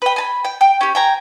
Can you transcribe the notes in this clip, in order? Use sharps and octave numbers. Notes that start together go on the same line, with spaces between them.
B4 G5
G#5 A5 B5
G5
G5
C#4 G4
G5 G#5 A#5